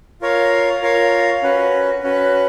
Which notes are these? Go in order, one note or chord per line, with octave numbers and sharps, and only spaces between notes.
F4 A#4 C#5 F5
F4 A#4 C#5 F5
C#4 F#4 B4
C#4 F#4 B4